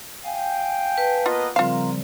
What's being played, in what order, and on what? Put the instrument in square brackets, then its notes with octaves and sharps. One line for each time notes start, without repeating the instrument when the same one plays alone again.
[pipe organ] F5 G#5 [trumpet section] G5
[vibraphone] B4 A5
[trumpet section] A#3 B3 D#5 [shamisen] F4
[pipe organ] C#3 F3 G3 [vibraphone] C4 [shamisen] F4 F5 [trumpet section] A#4